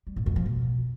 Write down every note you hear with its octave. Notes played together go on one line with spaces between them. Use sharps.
G3
A2
F2
F3
B2